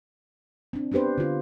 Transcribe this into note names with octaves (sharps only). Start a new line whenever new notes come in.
C4 D4
B3 D4 G4 B4 C5
D3 F4